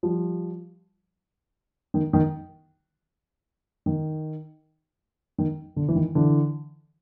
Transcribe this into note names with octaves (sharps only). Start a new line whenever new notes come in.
F3 G3
D#3
D#3
D#3
D#3
D3
E3
D#3
D3 E3